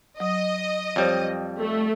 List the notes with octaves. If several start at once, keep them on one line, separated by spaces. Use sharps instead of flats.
F#3 D#5 D#6
F2 G3 C5 C#5
A3